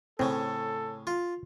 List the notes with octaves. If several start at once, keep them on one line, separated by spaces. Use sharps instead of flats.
A2 C#3 C4 A4
F4